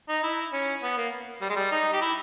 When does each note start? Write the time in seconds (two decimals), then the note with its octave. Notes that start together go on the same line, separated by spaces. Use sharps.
0.09 D#4
0.23 E4
0.53 C#4
0.83 B3
0.97 A#3
1.42 G3
1.50 G#3
1.56 G3
1.72 D#4
1.93 G4
2.01 E4